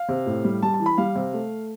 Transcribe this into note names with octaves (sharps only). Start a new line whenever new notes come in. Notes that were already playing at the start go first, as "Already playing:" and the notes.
Already playing: F5
C3
A2
G3
G3 A5
A5
E3
B5
G3 F5
C3
A3